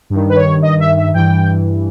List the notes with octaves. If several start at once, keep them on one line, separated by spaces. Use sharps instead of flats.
G2 D#3
B4
C#5
D#5
E5
E5
G2 E3 G5